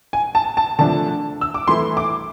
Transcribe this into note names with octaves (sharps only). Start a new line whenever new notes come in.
G#5
A5
A5
D3 F3 A3 D4 A5
E6
D6
E3 A3 E4 C6
D6